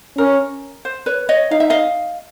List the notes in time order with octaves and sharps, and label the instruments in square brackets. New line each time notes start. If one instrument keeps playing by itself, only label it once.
[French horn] C#4 [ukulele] A#4
[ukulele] C5
B4 C#5
C#5 D#5
[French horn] D#4 [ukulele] F5
[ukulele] E5
D#5 F5